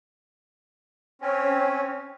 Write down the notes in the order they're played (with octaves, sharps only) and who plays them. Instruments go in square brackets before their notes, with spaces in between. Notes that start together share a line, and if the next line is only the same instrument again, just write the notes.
[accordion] C4 C#4